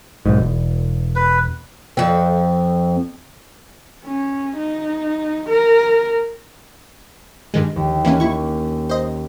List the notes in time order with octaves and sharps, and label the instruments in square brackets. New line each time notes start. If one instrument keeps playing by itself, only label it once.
[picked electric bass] B1 G#2
E1
[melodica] B4
[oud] F2 C4
[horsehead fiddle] C#4
D#4
A#4
[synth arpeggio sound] G2 D#3 G#3
[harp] D#2
[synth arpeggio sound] E3 A#3 C#4
[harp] A#3 C#4 [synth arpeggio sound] E4 C#6
[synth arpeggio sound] C5 D#5